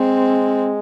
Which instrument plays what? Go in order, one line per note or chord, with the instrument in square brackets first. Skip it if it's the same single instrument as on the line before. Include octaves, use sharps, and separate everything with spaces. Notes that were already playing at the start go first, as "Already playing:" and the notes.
Already playing: [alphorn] G#3 [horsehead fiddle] C4